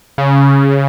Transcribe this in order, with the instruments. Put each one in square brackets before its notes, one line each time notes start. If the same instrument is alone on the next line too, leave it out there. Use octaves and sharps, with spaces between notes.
[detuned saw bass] C#3